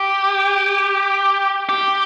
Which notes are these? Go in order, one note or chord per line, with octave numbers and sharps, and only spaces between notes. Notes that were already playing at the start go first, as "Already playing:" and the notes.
Already playing: G4
G4